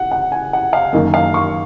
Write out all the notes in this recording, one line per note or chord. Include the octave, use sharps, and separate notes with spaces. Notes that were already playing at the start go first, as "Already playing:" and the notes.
Already playing: F#5
F#5
G#5
F#5
F5
F#2 D#3 A#3 D#5
F5
C#6